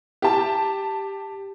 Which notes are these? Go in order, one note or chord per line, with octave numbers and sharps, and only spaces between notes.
G4 A5